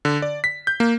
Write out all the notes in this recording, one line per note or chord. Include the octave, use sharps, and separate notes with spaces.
D3
D5
B6
G6
A#3